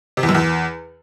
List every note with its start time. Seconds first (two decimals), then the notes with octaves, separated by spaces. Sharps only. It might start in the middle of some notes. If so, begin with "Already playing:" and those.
0.17 C3
0.23 E2
0.29 F#2
0.34 E2